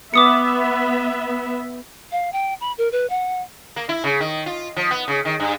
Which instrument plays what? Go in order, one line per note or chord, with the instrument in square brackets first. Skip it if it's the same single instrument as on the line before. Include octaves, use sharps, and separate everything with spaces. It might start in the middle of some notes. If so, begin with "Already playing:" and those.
[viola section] B3 E5 [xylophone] D6 D#6 C#7
[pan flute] F5
G5
B5
A#4
B4
F#5
[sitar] A#3
E4
C#3
D#3
F4
F3
B3
C#3
D#3
G2